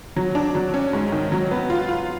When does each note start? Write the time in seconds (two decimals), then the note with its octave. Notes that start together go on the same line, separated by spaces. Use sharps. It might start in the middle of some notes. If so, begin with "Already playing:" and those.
0.16 F#3
0.35 D4
0.55 F#3
0.74 C#4
0.93 G#2
1.12 D#3
1.32 F#3
1.51 B3
1.70 F4
1.89 F4